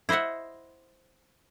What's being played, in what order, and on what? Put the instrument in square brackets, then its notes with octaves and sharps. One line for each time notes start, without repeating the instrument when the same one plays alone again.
[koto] E4 C5 D#5 E5 F#5